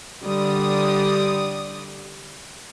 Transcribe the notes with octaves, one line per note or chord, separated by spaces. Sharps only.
D3 G3 D5 D#6